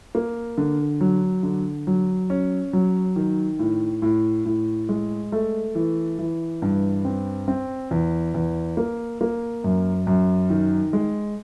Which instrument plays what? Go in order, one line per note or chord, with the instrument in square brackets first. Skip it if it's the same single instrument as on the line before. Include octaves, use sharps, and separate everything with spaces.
[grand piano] A#3
D3
F#3
D3
F#3
C#4
F#3
D#3
A2
A2
A2
G#3
A3
E3
E3
G2
C4
C4
E2
E2
A#3
A#3
F#2
F#2
D#3
G#3